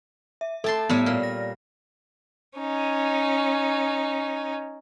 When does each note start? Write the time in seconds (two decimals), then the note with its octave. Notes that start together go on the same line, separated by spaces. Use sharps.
0.41 E5
0.64 A3 A4 A5 C6 A6
0.89 A2 G3 B3 C#5
1.06 A#2 F6
1.23 A#6
2.59 C#4 D#4